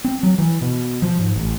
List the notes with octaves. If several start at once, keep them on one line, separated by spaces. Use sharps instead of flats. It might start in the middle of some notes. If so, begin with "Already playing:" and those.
C4
F#3
E3
B2
F3
G#2
A1